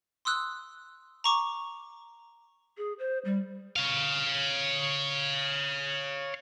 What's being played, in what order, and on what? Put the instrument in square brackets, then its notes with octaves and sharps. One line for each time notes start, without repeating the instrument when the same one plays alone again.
[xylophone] C6 D#6 E6 F#6
A#5 C#6 D6
[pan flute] G#4
C5
G3
[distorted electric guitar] C#5 F5